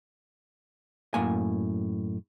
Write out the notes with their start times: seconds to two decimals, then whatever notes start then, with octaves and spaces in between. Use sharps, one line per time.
1.14 F#2 A2 A#3 G#5